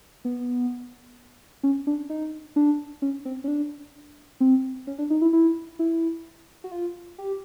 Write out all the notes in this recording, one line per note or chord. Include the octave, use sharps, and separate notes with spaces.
B3
C#4
D4
D#4
D4
C#4
C4
C#4
D4
C4
C#4
D4
D#4
E4
E4
E4
F#4
F4
G4